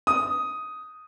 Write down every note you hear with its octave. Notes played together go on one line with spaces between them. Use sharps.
D#6